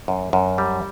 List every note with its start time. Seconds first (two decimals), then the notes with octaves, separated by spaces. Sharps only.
0.08 F#2
0.33 F#2
0.58 G3